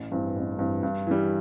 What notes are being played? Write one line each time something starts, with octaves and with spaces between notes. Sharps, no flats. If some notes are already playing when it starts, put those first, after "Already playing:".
Already playing: A1
G2 E3 C4
A1
G2 E3 C4
G2
E3 G3